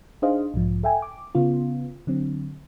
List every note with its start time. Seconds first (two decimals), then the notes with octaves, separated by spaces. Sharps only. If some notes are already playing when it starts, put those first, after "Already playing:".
0.22 D4 D#4 G#4 C5 D#5 F5
0.54 B1 G#2 F3
0.83 A4 E5 G5 G#5
1.02 D6
1.35 C#3 B3 F4
2.07 D3 F#3 C4